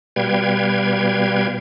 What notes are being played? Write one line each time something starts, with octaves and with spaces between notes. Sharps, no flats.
B2 G3 B4 F5 G5 G#6